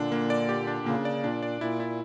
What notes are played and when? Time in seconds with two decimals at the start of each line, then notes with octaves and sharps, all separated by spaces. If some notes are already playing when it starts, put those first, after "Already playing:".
Already playing: A#2 D3 D4
0.12 A#3
0.30 D5
0.49 G4
0.67 D4
0.86 C#3 A#3
1.05 D5
1.24 A#2 D4
1.43 D5
1.61 A#2 E4
1.80 E4